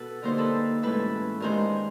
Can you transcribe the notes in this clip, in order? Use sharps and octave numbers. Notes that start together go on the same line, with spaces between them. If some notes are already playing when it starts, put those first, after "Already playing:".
Already playing: B2 A4 B4
D3 G3 A#3 D#4 A#4 C5
A4 B4
A2 E3 G#3 C#4 A4 B4
G2 D#3 G#3 A#4 C5